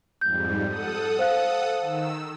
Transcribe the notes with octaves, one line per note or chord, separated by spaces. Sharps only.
F2 G#2 G3 G6
A4 F#5 D#6
C5 F5 F#6
D#3 E6